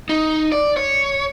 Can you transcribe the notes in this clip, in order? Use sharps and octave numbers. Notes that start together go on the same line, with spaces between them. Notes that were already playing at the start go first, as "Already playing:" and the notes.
D#4
D5
C#5